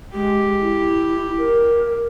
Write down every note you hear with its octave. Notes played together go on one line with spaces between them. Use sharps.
G#3 G4
E4
A#4